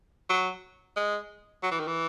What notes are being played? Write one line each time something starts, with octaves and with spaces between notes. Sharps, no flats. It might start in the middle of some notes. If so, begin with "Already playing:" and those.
F#3
G#3
F#3
E3
D#3
E3